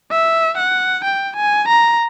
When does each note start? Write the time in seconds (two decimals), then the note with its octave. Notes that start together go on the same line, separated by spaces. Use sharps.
0.11 E5
0.58 F#5
1.05 G5
1.36 G#5
1.68 A#5